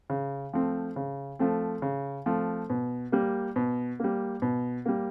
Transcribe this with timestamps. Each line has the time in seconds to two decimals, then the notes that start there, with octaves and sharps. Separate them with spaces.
0.10 C#3
0.53 F3 A3 C4
0.96 C#3
1.39 F3 A3 C4
1.82 C#3
2.26 F3 A3 C4
2.70 B2
3.12 G3 A#3
3.56 B2
4.00 G3 A#3
4.42 B2
4.86 G3 A#3